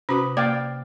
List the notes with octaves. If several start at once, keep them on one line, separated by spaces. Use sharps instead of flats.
C3 C#4 F#4 B4 B5 D6 D#6
A#3 D5 F5 G5